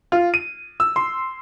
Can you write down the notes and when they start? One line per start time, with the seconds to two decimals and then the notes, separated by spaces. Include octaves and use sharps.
0.12 F4
0.34 D#7
0.80 E6
0.96 C6